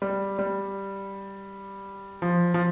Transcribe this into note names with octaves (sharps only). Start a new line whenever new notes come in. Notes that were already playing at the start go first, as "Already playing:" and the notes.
G3
G3
F3
F3